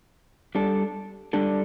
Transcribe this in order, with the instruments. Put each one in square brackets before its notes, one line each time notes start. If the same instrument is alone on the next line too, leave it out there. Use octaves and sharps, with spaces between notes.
[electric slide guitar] G3 D4 A4
G3 D4 A4